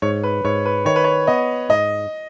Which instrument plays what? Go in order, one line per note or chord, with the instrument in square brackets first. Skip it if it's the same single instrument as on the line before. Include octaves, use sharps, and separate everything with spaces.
[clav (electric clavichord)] G#2 [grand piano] C#5
[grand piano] B4
[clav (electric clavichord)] G#2 [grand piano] C#5
[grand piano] B4
[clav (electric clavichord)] D#3 [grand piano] C#5
[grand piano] B4
C#5
[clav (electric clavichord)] B3 [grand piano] D#5
[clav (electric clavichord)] G#2 [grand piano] D#5